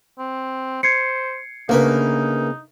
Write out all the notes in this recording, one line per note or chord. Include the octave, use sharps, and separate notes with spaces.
C4
C5 G#6 C7 C#7
D2 C#3 A#3 D#4 A#4 B4